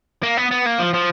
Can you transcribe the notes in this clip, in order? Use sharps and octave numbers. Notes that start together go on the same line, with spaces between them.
A#3
B3
B3
A#3
F3
F3